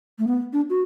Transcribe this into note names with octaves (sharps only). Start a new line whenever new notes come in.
A3
B3
D4
F#4